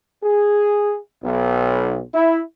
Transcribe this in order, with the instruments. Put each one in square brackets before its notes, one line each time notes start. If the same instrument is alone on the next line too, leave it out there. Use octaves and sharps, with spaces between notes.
[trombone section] G#4
B1
E4